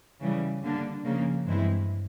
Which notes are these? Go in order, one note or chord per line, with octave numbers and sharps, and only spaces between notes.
C#3 E3 G3
D3 G3 A#3 D4
C#3 F3 A#3
G2 E3 G#3 C4 E4